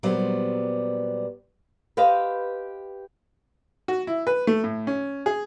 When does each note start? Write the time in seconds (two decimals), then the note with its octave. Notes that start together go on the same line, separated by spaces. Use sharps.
0.03 A#2 F#3 G3 B3 C5 D5
1.97 G4 B4 C5 D#5 F5
3.88 F#4
4.07 E4
4.27 B4
4.47 A3
4.64 A2
4.87 C#4
5.26 G#4